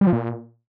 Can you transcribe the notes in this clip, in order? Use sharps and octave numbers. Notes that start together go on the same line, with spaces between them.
G3
F3
A#2